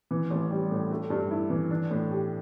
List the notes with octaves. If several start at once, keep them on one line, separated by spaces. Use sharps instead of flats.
E3
A1
G3
A2
A3
G2
E4
E3
D4
A2
G4